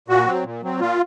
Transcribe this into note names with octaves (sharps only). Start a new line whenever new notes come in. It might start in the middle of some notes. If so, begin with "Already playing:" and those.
A#2 F#4
F#3 C4
A#2
F#3 C4
A#2 F4